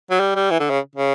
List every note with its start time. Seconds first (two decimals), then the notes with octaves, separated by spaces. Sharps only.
0.11 F#3
0.20 G3
0.35 G3
0.51 E3
0.60 D3
0.70 C#3
0.96 C#3